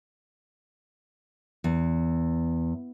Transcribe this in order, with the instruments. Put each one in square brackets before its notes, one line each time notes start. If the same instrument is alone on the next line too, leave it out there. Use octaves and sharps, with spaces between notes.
[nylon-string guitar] E2